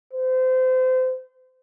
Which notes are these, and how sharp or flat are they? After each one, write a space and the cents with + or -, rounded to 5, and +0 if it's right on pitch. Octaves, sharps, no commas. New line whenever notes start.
C5 -30